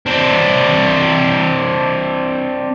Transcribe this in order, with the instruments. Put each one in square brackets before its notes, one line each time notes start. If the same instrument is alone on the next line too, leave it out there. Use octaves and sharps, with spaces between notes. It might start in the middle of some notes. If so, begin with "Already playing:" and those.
[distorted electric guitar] C4 D4